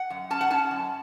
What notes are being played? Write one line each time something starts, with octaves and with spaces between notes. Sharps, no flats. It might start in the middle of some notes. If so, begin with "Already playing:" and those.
Already playing: F#5
F#2
C#4 A5
F#5
C#4 A5
F#2